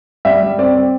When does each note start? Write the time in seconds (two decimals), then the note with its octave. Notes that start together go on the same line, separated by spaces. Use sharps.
0.25 G3 E5
0.43 G3
0.59 C4 D5
0.75 C4